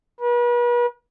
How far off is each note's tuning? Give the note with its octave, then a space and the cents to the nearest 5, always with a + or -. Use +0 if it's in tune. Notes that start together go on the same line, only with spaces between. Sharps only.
B4 -40